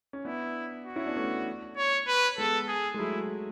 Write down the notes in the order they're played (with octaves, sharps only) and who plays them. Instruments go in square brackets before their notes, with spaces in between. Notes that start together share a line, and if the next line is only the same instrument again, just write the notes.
[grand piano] C#4
[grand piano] B3 D4 [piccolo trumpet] E4
[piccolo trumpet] F#4
[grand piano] C#4 E4
B3 D4
A3 C#4
[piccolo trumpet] C#5
B4
[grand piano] G#3 B3 [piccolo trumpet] A4
[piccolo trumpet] G#4
[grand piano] G#3
[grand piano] F#3 A3 [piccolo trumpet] E4